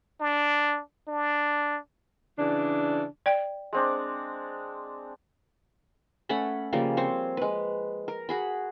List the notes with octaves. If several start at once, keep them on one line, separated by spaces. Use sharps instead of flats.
D4
D4
C#3 E3 D4
D5 G5
G#3 C4 D4
A3 C#4 F#5 B5
C#3 F3 G3 A#3
C4 C5 C#5
G#3 B4
A#4
F#4 G#4 B5